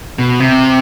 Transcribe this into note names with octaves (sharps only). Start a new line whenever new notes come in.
B2
C3